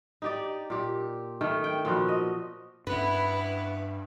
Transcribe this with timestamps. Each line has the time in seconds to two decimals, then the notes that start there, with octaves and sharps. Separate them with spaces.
0.22 D#4 G4 D5
0.70 A#2 G4
1.41 D#3 A3 G5
1.64 G5
1.85 A#2 F3 B3 F#4
2.08 D#5
2.87 G2 B3 C#4 E4 B4